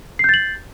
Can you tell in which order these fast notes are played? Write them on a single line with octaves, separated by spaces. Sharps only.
C7 G6 A6 F#7